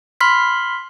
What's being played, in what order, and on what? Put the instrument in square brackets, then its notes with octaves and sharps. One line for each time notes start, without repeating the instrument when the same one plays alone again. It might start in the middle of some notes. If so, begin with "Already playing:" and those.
[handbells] B5 C6 F6 B6